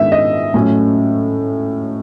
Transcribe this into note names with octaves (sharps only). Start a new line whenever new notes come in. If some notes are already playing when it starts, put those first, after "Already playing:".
Already playing: G#2 D#3 G#3 B3 D4 E5
D#5
A2 F#3 A3 C#4